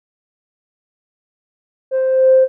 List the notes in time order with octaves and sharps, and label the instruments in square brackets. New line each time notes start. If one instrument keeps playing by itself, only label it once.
[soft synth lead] C5